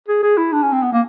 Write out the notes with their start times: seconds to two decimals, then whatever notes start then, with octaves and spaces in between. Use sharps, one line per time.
0.08 G#4
0.23 G#4
0.38 E4
0.53 D4
0.63 C#4
0.72 C4
0.82 B3
0.92 A#3